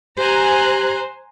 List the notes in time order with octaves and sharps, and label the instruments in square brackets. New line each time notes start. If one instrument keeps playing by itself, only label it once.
[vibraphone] G4 [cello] C5 [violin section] G#5 A#5 F#6